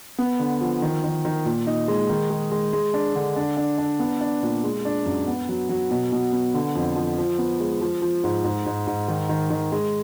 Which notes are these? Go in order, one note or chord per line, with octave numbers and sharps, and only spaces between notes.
B3
D3
F3
D#3
D#3
D#3
A#2
D#4
G#3
D#3
G#3
G#3
G#3
D4
D3
D4
D4
D4
B3
D4
A#2
G#3
D4
F#2
B3
F#3
F#3
B2
B2
B3
D3
F2
F3
F3
B3
G#3
F3
F3
G#2
G#2
G#2
G#2
D#3
D#3
D#3
G#3